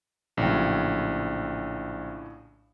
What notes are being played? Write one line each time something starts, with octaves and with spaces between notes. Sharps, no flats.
A#1 A2 C#3 F#3 G5